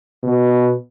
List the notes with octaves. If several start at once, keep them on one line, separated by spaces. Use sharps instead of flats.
B2